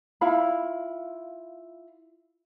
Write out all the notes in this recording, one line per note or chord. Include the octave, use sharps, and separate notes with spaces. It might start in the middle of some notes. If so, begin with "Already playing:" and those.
E4 F4 F5 B5